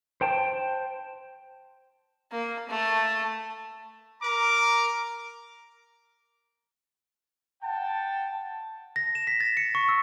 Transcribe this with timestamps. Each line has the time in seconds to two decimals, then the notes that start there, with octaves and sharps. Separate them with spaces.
0.21 C5 G5 A5
2.31 A#3
2.69 A3
4.21 A#4 A#5 D6
7.63 F#5 G5 A5
8.96 A#6
9.15 E7
9.27 B6
9.40 A6
9.57 C#7
9.75 C#6
9.89 E6